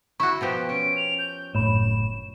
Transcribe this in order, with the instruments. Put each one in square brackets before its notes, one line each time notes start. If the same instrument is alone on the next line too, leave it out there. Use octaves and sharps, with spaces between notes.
[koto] E4 F#4 [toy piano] C#6
[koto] B2 F3 G4
[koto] C#4 [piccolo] D7
[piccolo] F7
G6
[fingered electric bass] F#1 A2 [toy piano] C#5 B5 [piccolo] E7